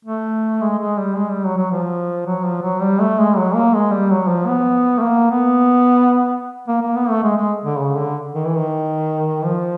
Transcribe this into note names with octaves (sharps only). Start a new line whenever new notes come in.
A3
G#3
G#3
G3
G#3
G3
F#3
F#3
F3
F#3
F3
F#3
G3
A3
G#3
F#3
A#3
G#3
G3
F#3
F3
B3
A3
A#3
B3
A#3
A#3
B3
A3
G#3
G#3
D3
C#3
D3
D#3
E3
D#3
F3